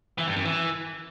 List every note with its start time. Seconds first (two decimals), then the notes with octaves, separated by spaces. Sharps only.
0.18 E3
0.27 G2
0.36 F#2
0.45 E3